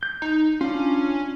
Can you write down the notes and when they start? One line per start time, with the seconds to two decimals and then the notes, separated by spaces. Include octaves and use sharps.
0.03 G6
0.22 D#4
0.61 C#4 D4 F4